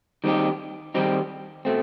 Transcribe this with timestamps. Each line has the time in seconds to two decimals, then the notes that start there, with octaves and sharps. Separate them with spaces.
0.24 D#3 G3 C4 D#4 G4
0.94 D#3 G3 C4 D#4 G4
1.65 B2 A3 C4